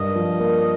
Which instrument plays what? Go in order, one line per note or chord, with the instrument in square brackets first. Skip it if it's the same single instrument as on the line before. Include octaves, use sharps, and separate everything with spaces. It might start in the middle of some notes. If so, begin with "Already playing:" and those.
Already playing: [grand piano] G2 A#4 [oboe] D#5
[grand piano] F3
A#3